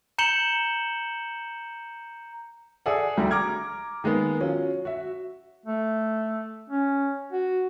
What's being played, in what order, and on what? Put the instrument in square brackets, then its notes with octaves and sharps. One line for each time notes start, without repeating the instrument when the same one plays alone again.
[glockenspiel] A#5 G6 C#7 E7 F#7 G7
[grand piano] G#4 A4 D5 E5 F#5
D2 G3 F#4 A4 A#5
A#5 D6 F6 G#6
D#3 G#3 A#3 B3
F#3 C#4 F4
F#4 E5
[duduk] A3
C#4
F#4